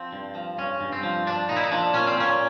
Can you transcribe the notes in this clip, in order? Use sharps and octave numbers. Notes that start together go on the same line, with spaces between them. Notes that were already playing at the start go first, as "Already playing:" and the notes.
Already playing: F3 C4
G2
F3
G2 C#4
G2
C4
F3
F3 D4
A#2 D#4
E4
D#4
F3 D4
A#2 C#4
C4
A#2 C#4